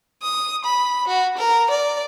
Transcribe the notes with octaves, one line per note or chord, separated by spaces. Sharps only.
D#6
B5
F#4
A#4
D5